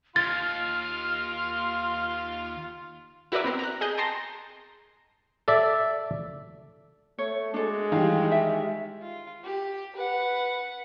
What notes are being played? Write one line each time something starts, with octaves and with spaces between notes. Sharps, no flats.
D#2 F4 F5 C6 F6 A6
E4 F#4 A#4 B4 D5 E5
B3 C4 A#4
A#5 F#6
G#4 D#5 G6
G5 A5 A#5 C6 A#6
A4 D5 E5
A3 C#5
G#3 D4 F#4 A4
D#3 E3 G3 F5
E5
F4
G4
B4 F#5